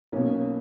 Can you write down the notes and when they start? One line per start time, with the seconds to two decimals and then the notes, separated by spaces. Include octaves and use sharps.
0.12 B1 B2 A#3 C#4